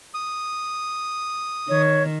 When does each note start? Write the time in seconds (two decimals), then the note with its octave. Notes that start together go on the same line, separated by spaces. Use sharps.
0.14 D#6
1.69 D#3 C#5